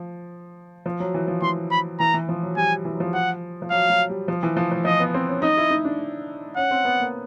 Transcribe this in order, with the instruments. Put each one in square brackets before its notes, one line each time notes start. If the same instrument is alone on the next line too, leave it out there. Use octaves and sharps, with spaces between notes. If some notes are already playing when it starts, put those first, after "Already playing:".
Already playing: [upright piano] F3
F3
F#3
E3
F3
[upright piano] E3 [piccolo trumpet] C6
[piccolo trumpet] B5
[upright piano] E3 [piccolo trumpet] A#5
[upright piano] E3
F3
F#3
[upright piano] G3 [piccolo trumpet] G#5
[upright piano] E3
F#3
F3
[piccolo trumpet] F#5
[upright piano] F3
[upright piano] F#3 [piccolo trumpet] F5
[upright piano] F#3
G3
F3
E3
F3
F3
[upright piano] F3 [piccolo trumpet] D#5
[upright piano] B3
C4
C#4
[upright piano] D#4 [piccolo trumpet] D#5
[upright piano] E4
D#4
D4
[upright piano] C#4 [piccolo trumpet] F#5
[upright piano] C4
B3
A#3